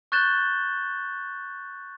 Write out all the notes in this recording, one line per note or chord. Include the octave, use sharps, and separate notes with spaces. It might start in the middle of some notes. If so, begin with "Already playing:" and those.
C#6 F#6 G6 A6 E7 G7